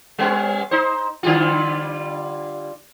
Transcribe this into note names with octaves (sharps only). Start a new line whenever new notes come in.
G3 B3 C#4
D#4 C5
D3 G3 F4